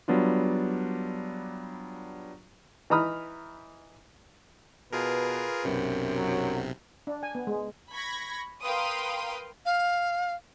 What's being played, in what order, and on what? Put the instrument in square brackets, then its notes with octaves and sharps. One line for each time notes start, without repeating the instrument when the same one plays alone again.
[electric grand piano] F#3 G3 B3 D4 F4
[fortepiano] E3 D#4 A#5 B5 D#6 F6
[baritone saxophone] B2 [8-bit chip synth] F4 G#4 A#4 [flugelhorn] B4
[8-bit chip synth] B1 C3 [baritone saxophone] F#2
[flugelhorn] F#3
[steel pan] D4
G#5
B3
G#3
[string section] B5 C#6 G#6 A#6
A#4 B4 F5 G5 C6 D#6
[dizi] F5